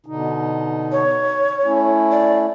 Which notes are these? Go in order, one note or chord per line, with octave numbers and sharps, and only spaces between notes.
B2 D3 D#4
C#5
A3 C#4 E4
D5